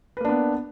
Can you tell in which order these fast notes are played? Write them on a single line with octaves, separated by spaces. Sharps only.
B4 A#3 D4 B3